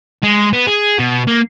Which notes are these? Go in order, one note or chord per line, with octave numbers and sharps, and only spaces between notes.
G#3
B3
G#4
B2
A#3